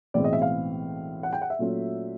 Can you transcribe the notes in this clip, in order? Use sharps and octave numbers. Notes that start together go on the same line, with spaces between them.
B1 A2 E3 G#3 C4 D5
D#5
E5
F5
F#5
G5
F#5
E5
A#2 F#3 A3 C#4 F4